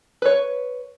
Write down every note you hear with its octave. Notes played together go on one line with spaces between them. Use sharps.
B4 C#5